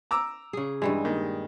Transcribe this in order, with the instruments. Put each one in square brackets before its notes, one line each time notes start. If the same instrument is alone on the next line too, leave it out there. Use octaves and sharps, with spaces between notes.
[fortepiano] A#5 D6 E6
[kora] C#3 G#4
[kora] G2 G3 G#3 [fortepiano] E3
[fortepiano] A#2 D#3